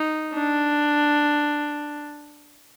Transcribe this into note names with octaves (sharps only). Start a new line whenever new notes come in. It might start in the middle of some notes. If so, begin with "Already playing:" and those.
Already playing: D#4
D4